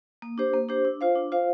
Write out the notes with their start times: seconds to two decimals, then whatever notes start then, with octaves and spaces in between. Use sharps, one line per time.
0.22 A#3
0.38 D4 G4 C5
0.53 A#3
0.68 D4 G4 C5
0.85 D4
1.01 F4 C5 F5
1.16 D4
1.32 F4 C5 F5